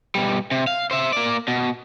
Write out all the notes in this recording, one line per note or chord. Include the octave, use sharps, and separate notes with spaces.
B2 G3
C3
F5
C5 E5
A#3 D5
B2